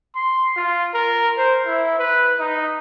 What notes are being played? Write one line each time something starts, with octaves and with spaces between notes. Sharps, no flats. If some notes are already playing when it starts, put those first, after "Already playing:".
C6
F4
A#4
C5
E4
B4
D#4